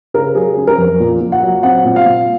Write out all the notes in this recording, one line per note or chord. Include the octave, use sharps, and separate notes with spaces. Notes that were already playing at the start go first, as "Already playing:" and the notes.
C#3 A#4
F#3 G#4
C#4
A#4
F2
A#2
A#2
F#5
F#3
C4 F#5
A#2
F5
A#2